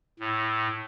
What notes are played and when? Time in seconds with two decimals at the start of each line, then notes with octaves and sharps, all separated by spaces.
0.20 A2